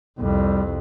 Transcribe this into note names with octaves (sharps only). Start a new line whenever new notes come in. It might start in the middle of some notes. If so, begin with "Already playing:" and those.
C2 F2 G3